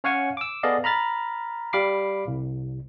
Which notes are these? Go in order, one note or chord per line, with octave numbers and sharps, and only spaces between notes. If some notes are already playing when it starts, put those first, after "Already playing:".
C#4 C#5 F5 F#5 G#5 C#6
D6 E6
B3 G#4 A4 D5 D#5 F5
A#5 B5 F6 A6
G3 F5 B5 D6 C7
C2